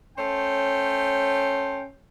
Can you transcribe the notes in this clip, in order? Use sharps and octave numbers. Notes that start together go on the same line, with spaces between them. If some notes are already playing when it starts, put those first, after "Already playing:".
A3 C#4 C5 C#5 G5